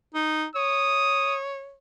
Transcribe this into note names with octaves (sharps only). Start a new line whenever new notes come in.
D#4
C#5 D#6